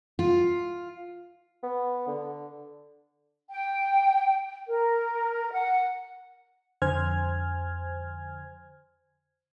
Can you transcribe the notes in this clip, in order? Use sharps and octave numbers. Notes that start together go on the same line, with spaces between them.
F4
B3
D3
G5
A#4
F#5
F2 D3 C5 G#5 F6 G#6